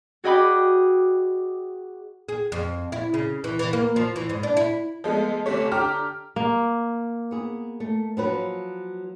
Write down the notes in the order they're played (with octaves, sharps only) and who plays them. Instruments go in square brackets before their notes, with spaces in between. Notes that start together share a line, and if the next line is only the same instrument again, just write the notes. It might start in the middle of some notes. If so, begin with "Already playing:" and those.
[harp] F#4 G#4 D#5 G5 B5 D6
[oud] G#4
F2
E4
C#3
E3
E3
A#3
F3
E3
G#2
D4
E4
[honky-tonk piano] F3 G#3 A3 B3
G1 C3 A3 C#5
D3 G4 A#5 D6 F6
[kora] A#3
[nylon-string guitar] B3 G#4
A3
F3 F#3 B4